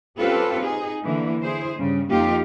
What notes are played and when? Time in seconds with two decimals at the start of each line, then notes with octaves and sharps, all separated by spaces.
0.18 C4 C#4 F4 G4 A4 B4
0.62 D#4 G#4
1.04 D3 E3 A#3
1.43 E4 G#4 C5
1.77 G2 C#3 G3
2.10 F2 A#3 D#4 F4 G4